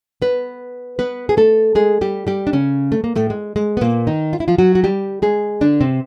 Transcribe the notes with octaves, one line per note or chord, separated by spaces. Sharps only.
B3 B4
B3 B4
G#4
A3 A4
G#3 G#4
G3 G4
G3 G4
D4
C#3 C#4
A3
A#3
A2 A3
G#3
G#3
B3
A#2 A#3
D#3 D#4
F4
E4
F3 F4
F#3 F#4
F#4
G3 G4
G#3 G#4
D3 D4
C3 C4